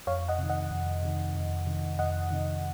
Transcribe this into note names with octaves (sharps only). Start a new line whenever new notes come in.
F2 C#5 F5
D#5 F#5
C3 D#3
D#5 F#5
F2
C3 D#3
F2
C3 D#3
F2 D#5 F#5
C3 D#3